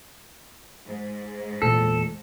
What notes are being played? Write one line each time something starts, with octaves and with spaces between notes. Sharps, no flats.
G#2
E2 A#2 A4